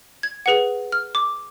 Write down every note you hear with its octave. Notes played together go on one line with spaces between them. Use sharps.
G#6
G#4 B4 F#5
F6
D6